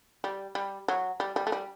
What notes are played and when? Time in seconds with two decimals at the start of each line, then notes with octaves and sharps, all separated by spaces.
0.24 G3
0.55 G3
0.88 F#3
1.20 G3
1.36 G3
1.47 A3
1.52 G3